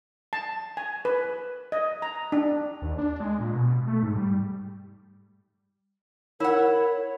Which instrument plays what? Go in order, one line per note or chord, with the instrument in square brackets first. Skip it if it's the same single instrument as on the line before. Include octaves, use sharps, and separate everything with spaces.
[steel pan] A5
G#5
B4
D#5
A#5
D4
[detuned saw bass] D#2
D4
G#3
A#2
B2
A3
G#2
G3
[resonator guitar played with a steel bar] E4 F#5 [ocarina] A#4 [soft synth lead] C#5